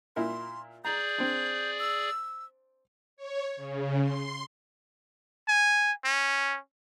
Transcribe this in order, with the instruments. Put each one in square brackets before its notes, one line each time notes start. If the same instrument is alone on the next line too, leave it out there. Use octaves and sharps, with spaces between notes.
[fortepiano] A#2 E4 A#4 [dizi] C6
[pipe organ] G#4 D5 [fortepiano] A#5 [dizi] G6
[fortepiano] C4 D4
[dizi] E6
[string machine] C#5
C#3
C6
[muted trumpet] G#5
C#4